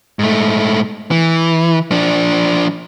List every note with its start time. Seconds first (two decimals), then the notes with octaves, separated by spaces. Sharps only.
0.19 G#2 A3
1.11 E3
1.91 F3 D4